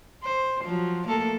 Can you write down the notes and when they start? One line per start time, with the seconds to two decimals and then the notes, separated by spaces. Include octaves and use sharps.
0.23 C5
0.64 F3 F#3
1.07 A3 A#3 A4